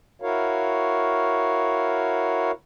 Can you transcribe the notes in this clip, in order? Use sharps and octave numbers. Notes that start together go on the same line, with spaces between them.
E4 F#4 A#4 C#5 F5